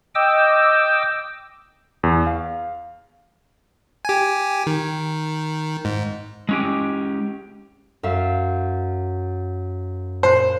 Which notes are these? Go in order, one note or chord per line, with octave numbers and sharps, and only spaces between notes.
D#5 G5 D6 E6
E2
F5
G4 G#5
D#3
G#2
G#3 C#4 G4
F#2 E5 F5
A#2 C5 F#6